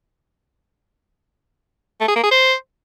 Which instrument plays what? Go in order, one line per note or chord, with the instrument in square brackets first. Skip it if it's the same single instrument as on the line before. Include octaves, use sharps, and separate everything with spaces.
[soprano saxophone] A3
G#4
A#3
G#4
C5